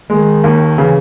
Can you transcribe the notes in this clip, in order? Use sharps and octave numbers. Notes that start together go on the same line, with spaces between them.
D#3 G#3
D#2
C#3 E3